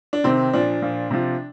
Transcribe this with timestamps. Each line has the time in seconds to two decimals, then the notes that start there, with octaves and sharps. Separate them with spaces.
0.13 D4
0.24 C3 D#3 C4
0.53 A#2 F3 D4
0.82 A#2 F3
1.11 C3 F3